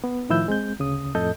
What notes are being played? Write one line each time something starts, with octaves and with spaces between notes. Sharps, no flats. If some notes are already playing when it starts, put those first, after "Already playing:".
B3
A2 D#3 F3 E4 E6 G6
G#3 C4 G6
D2 C#3 D#6
F2 A2 A4 D#5 G6